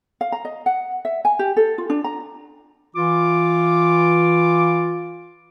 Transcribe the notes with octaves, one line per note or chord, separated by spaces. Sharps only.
F5
A#5
D#5
F#5
E5
G#5
G4
A4
F4
D4
A#5
E3 F4 D6